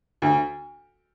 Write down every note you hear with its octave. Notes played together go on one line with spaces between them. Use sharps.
D2